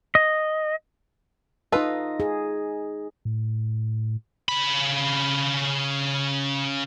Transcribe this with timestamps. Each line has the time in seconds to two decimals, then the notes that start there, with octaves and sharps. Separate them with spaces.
0.15 D#5
1.72 D#4 F4 A4 B4 D#5
2.20 G#4
3.25 A2
4.48 C#3 B5